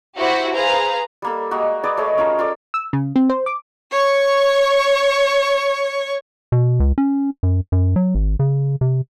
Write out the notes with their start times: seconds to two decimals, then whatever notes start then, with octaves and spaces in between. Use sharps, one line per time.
0.16 E4 F#4 G4 C5 E5 F#5
0.53 G#4 B4 C5 F5 A#5
1.22 G3 A#3 A4
1.51 G#3 A#3 F#4
1.84 G#4 B4 D5 D6
1.97 A3 G#4 C#5 D#5
2.18 C#4 F4 A#4
2.39 F4 A4 D5
2.74 E6
2.93 C#3
3.16 C4
3.30 C5
3.46 D6
3.92 C#5 C#6
6.52 B2
6.80 C#2
6.98 C#4
7.43 F#2
7.72 F#2
7.96 F#3
8.15 G#1
8.39 C#3
8.81 C3